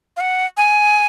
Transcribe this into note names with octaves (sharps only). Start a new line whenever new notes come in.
F5
F#5
G#5